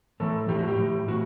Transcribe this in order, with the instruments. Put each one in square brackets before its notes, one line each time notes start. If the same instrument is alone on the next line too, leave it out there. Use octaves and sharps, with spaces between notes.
[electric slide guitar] A2 E3 A4
A2 E3 G4
F#4
G4
A2 E3
A2 F#4